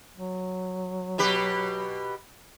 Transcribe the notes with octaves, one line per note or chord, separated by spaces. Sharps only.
F#3
B2 G4 B4